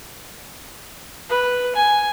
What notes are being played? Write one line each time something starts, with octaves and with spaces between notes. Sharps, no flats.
B4
G#5